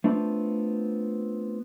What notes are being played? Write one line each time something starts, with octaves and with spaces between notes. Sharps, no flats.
A3 B3 C4 D4 F4